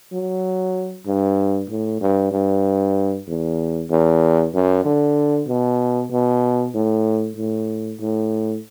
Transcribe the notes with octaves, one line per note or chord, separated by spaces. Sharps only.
F#3
G2
A2
G2
G2
E2
E2
F#2
D3
B2
B2
A2
A2
A2